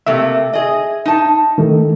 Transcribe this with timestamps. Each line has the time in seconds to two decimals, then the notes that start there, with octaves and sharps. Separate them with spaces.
0.06 C3 A3 A#3 E5
0.53 G#4 D#5
1.05 D#4 A5
1.58 D#3 A3